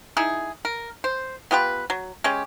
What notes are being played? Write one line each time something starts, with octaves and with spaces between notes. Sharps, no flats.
D#4 E4 G#4
A#4
C5
B3 F4 G4 B4
F#3
G#3 C#4 G4